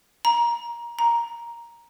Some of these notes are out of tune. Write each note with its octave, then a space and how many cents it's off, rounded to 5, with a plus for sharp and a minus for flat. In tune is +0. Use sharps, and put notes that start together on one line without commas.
A#5 +20
A#5 +5